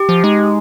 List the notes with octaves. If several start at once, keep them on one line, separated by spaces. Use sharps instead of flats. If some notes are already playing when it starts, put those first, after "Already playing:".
Already playing: G4
F3
G#3 D#4